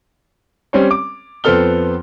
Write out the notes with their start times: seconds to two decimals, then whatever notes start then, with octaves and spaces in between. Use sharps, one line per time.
0.73 G3 C4 C#4 C#5
0.91 D6
1.44 F2 B3 C4 A4 F6 G7